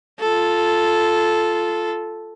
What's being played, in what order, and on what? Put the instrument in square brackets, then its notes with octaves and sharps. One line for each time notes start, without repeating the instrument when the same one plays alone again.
[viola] F4 A4